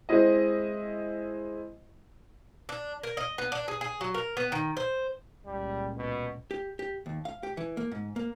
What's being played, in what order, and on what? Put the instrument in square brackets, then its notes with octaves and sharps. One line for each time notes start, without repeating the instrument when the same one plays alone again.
[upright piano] G#3 C4 E4 D#5
[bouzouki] D4
A#4
D#5
B3
D4
G#4
G#4
F#3
A#4
B3
D#3
C5
[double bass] C#2 A#2 [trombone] G3
[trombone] B2
[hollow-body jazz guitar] G4
G4
D#2
F5
G4
E3
A#3
G#2
A#3